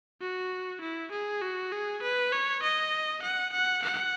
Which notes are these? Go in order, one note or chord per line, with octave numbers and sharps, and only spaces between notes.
F#4
E4
G#4
F#4
G#4
B4
C#5
D#5
F#5
F#5
F#5